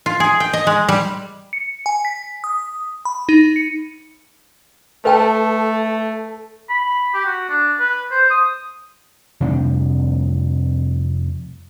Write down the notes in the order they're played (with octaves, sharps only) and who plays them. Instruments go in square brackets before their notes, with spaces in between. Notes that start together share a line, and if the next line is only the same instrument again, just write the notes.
[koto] F4
G#4
G5
D#5
G#3
G3
[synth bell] C#7
G#5
B6
D#6
B5
D#4
C#7
[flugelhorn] A3 [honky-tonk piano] A4 [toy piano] B4 G5 A5
[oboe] B5
G4
F#4
D4
B4
C5
D#6
[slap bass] F2 C3 G3 D4